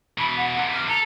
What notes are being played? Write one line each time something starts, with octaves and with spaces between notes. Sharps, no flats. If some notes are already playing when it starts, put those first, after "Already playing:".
B2 E3 B5
F#5
C3 E3
F6
A4 A#5